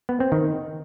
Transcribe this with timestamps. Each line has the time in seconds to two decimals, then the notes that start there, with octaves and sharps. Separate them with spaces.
0.09 B3
0.20 C4
0.32 D#3